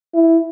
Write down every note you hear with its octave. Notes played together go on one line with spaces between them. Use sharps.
E4